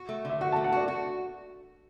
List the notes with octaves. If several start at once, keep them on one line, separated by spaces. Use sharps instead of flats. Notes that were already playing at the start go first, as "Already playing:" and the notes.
Already playing: F#4
A3
D3 E5
F#4 F#5
A5
A3
F#5
F#4 D5
F#4